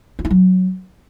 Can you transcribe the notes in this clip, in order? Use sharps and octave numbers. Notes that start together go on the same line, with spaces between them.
F4
E4
F#3